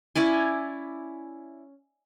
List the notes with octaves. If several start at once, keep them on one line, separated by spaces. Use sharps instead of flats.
C#4 E4 D5 G#5